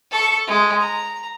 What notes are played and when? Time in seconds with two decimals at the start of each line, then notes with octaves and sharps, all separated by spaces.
0.11 A4 C#6
0.47 G#3
0.81 A#5